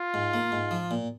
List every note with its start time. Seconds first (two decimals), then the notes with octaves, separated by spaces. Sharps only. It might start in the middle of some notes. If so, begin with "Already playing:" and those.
Already playing: F4
0.14 G#2
0.34 A#3
0.52 G#2
0.71 F3
0.91 A#2